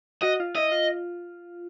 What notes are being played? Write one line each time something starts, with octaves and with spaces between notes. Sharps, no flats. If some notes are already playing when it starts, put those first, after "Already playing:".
F#4 D#5
F4
E4 D#5
F4